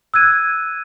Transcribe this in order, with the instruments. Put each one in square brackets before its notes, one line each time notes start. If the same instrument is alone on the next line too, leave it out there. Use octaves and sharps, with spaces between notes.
[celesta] E6 F#6 G#6 D#7